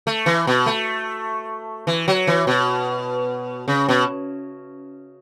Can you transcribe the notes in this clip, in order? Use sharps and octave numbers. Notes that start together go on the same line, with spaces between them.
A3
E3
B2
A3
E3
F#3
E3
B2
C#3
B2